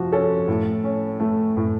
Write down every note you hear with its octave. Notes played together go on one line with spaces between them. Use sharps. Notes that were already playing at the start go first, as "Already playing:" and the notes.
Already playing: C3 F3 F#4
C#4 A4
A2
C#4
A3
A2